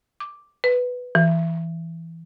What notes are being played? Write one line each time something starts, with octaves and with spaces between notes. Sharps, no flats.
D6
B4
E3